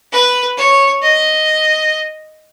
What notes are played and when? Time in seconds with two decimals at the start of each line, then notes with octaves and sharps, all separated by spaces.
0.12 B4
0.57 C#5
1.02 D#5